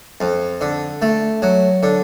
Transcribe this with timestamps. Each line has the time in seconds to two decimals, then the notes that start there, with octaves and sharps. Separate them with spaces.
0.21 F2
0.61 D3
1.02 A3
1.42 F#3
1.83 D3